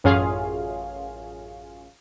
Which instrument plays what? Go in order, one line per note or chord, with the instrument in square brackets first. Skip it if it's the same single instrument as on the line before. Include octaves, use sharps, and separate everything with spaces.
[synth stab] A1 F#2 C#4 F4 G#4 F5